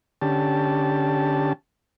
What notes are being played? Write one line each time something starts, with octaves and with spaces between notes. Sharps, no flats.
D3 C#4 G4 A5